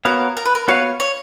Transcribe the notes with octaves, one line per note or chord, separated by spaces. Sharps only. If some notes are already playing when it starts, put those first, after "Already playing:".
B3 F#4 A#4 C#5 F5
A#4
B4
A#4
B3 F#4 B4 C#5 F5
C#5